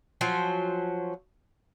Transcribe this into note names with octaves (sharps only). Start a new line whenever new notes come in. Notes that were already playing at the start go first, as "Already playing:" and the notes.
F3 F#3 C#4 C5